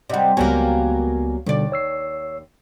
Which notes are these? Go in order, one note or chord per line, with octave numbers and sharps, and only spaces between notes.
C3 G3 D5 D#5 F#5
C#2 F#3 G3 A#3 B3 G#5
D#2 B2 D3 G3 D5
C#5 E6 C7